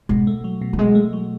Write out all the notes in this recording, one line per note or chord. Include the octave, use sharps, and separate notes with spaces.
B2 G#3
A3
F#3
B2
G3
B2 G#3
A3
F#3